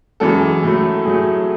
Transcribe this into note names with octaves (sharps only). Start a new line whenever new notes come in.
F#2 E3 G#3 A4
A2 F#3 A3
A2 F#3 A3 G#4